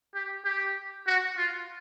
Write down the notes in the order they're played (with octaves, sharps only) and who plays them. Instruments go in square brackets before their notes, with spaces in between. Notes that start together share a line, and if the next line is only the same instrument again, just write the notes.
[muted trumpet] G4
G4
F#4
F4